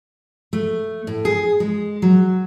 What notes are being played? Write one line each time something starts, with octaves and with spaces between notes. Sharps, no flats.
A3
A2
G#4
G#3
F#3